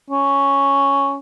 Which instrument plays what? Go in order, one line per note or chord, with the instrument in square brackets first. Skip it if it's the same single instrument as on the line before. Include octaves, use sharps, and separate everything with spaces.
[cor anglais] C#4